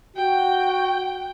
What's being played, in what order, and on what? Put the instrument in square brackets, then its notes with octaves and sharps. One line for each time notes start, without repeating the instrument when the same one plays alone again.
[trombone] F#4 [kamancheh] G5